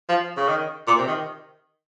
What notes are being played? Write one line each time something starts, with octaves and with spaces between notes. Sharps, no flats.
F3
C#3
D#3
A#2
C3
D#3